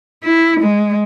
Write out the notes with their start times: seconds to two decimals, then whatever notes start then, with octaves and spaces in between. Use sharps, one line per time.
0.23 E4
0.60 G#3